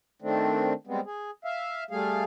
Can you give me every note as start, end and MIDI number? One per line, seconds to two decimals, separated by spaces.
0.22 0.73 51
0.22 0.73 57
0.22 0.73 60
0.22 0.73 62
0.87 1.00 55
0.87 1.00 56
0.87 1.00 59
0.87 1.00 60
1.06 1.31 68
1.45 1.84 76
1.45 1.84 77
1.91 2.24 55
1.91 2.24 57
1.91 2.24 68
1.91 2.24 77